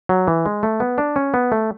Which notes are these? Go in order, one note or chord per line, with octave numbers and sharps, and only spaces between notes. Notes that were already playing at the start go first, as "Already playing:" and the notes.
F#3
E3
G#3
A3
B3
D4
C#4
B3
A3